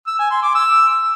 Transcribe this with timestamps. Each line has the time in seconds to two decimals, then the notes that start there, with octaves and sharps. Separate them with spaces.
0.07 E6
0.19 G#5
0.31 C6
0.43 D6
0.55 E6